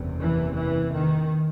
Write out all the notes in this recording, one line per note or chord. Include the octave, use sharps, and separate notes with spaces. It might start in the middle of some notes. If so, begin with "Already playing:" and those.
Already playing: F#1 E2 C3
E3
E3
D#3